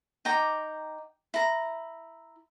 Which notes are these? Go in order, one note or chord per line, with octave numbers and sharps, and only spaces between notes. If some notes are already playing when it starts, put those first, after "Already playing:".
D#4 G5 A#5 D6
E4 A#5